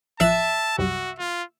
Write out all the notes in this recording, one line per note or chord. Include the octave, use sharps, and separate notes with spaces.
A1 F3 E5 A5 F#6
C2 F#2 G3 F#4
F4